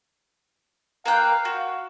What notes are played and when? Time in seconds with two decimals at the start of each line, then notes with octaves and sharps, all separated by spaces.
1.06 A#3 F5 G5 F#6
1.45 F#4